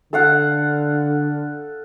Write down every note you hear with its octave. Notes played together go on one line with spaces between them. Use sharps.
D3 A4 F5 F#5